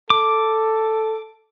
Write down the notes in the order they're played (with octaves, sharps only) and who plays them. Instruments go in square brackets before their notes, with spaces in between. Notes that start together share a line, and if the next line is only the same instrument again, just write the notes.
[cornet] A4 [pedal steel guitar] D6